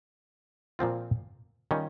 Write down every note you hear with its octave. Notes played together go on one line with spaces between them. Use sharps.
A#2 F3 C4 F4
D#3 G3 C#4 F4